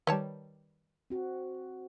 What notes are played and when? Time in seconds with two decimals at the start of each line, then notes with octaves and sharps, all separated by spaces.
0.07 D#3 G3 B4 C#5 A5
1.10 C4 F#4